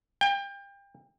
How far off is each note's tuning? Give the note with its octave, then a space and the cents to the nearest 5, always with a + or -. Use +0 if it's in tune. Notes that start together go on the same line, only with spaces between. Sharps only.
G5 +30